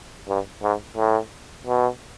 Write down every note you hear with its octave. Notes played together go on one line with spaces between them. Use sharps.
G2
G#2
A2
B2